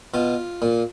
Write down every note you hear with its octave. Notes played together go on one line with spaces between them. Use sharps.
B2 F4
A#2